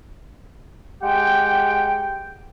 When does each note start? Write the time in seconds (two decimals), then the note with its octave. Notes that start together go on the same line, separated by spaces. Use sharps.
1.02 G#3 G4 F#5 G5